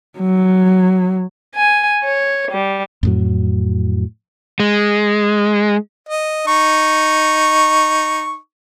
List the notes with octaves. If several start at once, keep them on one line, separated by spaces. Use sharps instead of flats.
F#3
G#5
C#5
G3
F2 A2 F#3
G#3
D#5
D#4 C#6